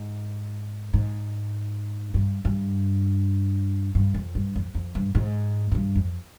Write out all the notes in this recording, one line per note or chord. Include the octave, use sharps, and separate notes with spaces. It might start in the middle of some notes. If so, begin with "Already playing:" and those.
Already playing: G#2
G#2
G2
G2
G2
F2
G2
F2
F2
G2
G#2
G#2
G2
F2